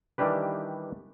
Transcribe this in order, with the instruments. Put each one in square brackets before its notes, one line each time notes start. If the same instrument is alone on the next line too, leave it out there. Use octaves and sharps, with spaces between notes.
[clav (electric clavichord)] D#3 E3 G3 D4 G4 B4